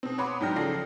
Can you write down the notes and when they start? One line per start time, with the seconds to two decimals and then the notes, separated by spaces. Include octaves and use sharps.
0.03 B2 C4
0.18 C#5 F#5 B5 C6 D6 D#6
0.40 G#2 F#3 D4 G5 F6 A#6
0.56 C#3 F3 A4 D5 A#6 C7